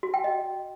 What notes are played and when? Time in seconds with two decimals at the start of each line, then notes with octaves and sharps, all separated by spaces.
0.03 F#4
0.14 G5
0.24 D#5